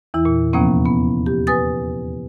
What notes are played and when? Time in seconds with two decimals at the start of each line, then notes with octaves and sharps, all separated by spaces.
0.14 E2 E3 E4
0.25 A#2
0.53 D#2 C3 F3 A#3 B3 C#4
0.85 B3
1.26 G4
1.47 B4 G#5 D#6 A6